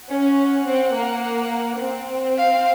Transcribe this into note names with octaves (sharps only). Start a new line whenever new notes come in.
C#4 F#5
C4
A#3
C4
F5